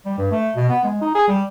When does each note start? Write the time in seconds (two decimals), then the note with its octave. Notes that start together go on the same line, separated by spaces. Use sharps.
0.06 G3
0.18 G2
0.31 A3
0.56 B2
0.69 B3
0.84 G#3
1.01 D#4
1.15 G#4
1.28 G3